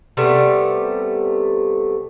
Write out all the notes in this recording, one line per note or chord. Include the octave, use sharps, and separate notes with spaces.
C3 G3 A3 B3